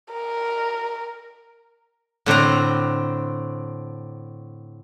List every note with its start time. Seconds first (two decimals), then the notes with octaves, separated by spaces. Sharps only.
0.13 A#4
2.26 A2 D3 C4 A#5